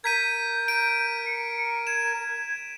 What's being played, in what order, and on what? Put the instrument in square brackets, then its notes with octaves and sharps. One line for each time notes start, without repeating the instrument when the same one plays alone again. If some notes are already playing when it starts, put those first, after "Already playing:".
[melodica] A#4 [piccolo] G6 [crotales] G#6 B6 D#7
[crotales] D7
[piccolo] C#7
[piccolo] G#6 [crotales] E7